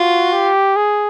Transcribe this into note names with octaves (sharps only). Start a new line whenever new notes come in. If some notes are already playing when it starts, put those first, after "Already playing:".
Already playing: F4 F#4
G4
G#4